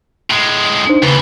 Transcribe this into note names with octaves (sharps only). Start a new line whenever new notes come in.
A2 G#3
D4 D#4 C5
D#2 C#3 E3 B4